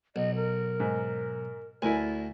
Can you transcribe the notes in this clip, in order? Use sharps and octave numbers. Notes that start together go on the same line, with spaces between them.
B1 D#5
A#4
G#2
D2 E4 A#4 D5 G#5